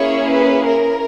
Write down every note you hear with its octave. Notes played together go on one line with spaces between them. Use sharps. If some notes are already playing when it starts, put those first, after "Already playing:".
Already playing: A#3 C#4 E4 G#4 C#5
B4
A#4